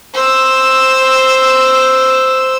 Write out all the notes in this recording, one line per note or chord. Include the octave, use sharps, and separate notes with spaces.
C5 E6